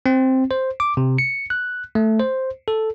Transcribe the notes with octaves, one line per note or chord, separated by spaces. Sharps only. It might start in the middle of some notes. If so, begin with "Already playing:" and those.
C4
C5
D6
C3
C#7
F#6
A3
C5
A4